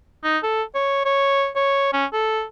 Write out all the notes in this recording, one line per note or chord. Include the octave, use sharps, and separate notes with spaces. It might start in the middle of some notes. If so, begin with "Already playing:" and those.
D#4
A4
C#5
C#5
C#5
C#4
A4